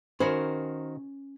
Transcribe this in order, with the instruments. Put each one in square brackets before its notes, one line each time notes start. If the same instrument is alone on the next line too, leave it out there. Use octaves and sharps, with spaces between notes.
[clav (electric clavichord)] D#3 F#4 A#4 [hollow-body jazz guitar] C#4 B5 [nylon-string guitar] C5